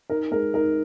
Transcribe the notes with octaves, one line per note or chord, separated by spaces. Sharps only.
D#4 A#4
G#3 A#4
D#4 A#4